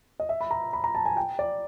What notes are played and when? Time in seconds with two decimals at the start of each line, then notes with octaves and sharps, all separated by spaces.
0.20 D#5
0.29 E5
0.41 B5
0.51 A#5
0.73 B5
0.84 A#5
0.95 A5
1.06 G#5
1.17 G5
1.39 D5